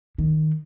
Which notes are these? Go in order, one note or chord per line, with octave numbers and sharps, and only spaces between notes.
D#3